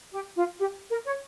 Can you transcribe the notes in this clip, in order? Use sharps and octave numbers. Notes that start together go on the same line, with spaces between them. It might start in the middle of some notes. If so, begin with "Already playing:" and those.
G4
F4
G4
A#4
C#5